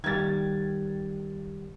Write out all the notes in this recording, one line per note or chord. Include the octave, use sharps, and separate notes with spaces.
D#3 G3 G#6 A6